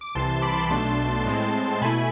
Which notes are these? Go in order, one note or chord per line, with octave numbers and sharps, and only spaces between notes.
D6
C2 C3 E3 A5 C6
A5 C6
B5 D6
A5 C6
B1 B2 A3 D4
A2 G#3 C4
B2 A3 E4 G#5 B5